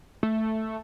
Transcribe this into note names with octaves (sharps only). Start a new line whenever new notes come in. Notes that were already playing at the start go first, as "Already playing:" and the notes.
A3